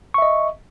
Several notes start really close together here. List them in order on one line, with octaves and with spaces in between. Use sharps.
C#6 E5 D#5